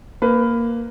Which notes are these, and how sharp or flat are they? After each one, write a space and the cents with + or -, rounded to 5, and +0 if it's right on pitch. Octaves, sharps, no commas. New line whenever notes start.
A#3 +0 B4 +15